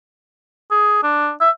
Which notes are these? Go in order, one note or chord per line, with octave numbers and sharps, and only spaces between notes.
G#4
D4
E5